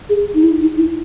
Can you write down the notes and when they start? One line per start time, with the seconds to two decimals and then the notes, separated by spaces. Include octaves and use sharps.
0.09 G#4
0.35 D#4
0.43 E4
0.61 D#4
0.78 E4